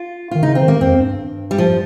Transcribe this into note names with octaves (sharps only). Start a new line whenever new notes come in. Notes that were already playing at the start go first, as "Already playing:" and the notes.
Already playing: F4
D#3 F4
C#3 D#4
C4
D#3
A#3
F2 C4
G2
G3
F3